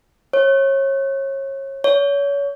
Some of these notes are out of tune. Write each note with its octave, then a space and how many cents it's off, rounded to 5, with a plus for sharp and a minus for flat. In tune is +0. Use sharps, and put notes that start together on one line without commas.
C#5 -30
C#5 +30